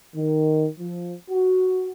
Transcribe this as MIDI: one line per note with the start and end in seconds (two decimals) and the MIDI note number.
0.16 0.66 51
0.79 1.12 53
1.29 1.90 66